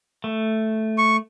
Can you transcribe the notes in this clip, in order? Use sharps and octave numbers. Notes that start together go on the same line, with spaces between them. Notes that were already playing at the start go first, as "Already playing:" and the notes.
A3
C#6